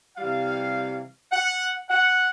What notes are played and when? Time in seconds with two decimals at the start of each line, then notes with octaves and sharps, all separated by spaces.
0.17 C3 E3 G3 F5
1.32 F#5
1.90 F#5